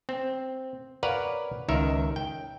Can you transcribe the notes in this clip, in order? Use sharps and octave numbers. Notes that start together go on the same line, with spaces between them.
C4
A#4 B4 C#5 D5 F5 F#5
C#2 D#3 A#4 E5
G5